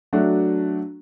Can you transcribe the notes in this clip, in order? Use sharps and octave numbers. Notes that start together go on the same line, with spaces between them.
F#3 A3 D4 F#4